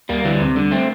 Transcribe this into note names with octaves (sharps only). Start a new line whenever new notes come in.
D2 G3 A#3
D3 E3 G3
D2 C3
D3 G3
A3 C4